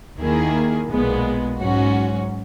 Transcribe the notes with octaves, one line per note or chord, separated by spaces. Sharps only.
D#2 D#3 A#3 E4 G#4
B1 A#2 G#3 B3
G#2 F#3 C#4 F#4